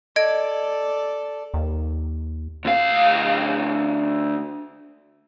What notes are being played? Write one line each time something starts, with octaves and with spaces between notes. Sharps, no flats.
A4 D5 D#5 G#6 D7
D#2
D2 F5